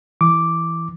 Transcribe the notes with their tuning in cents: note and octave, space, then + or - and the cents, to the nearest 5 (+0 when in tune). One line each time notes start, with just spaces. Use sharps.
E3 +0 D6 +0